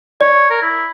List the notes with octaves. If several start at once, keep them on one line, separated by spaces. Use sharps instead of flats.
C#5 D5
A#4
E4